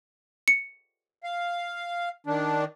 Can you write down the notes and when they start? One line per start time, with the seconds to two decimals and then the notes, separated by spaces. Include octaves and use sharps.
0.48 C#7
1.23 F5
2.27 D#3 D4